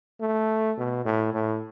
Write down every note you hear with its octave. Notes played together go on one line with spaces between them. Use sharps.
A3
B2
A2
A2